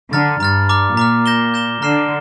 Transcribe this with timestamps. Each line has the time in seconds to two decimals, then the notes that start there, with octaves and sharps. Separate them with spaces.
0.13 D3 A#5 F6 A6
0.40 G2 A#5 F6 A6
0.69 A#5 D6 F6
0.97 A#2 A#5 D6 F6
1.26 G6 A#6 E7 G7
1.54 G6 A#6 E7 G7
1.82 D3 A#5 F6 C7 E7